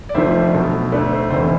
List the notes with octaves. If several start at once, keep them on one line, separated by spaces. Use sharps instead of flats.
D5
F1 F2 D3 F3 A3 C5 E5
B1 B2 A3
D2 D3 A3 B4 D5
C5
F1 E2 C3 E3 C5